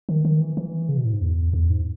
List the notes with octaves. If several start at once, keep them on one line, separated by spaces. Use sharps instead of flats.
D#3
D#3
E3
E3
C#3
B2
A2
G#2
E2
E2
G#2